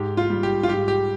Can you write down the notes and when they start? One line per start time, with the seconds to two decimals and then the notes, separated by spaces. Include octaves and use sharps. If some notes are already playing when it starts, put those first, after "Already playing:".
Already playing: G#2 G4
0.17 F4
0.30 G3
0.43 G4
0.63 F4
0.68 G#2 G4
0.88 G4